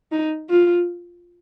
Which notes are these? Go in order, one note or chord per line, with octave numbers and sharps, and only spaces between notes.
D#4
F4